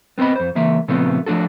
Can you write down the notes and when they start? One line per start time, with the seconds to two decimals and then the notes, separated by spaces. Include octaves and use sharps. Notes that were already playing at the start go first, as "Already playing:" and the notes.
0.18 B3 C4 B4 D#5 B5
0.36 F2 C5
0.55 C#2 E3 A#3 E5
0.88 A#2 C#3 F3 A3 B3 C4
1.26 F3 A3 D4 F#4 A4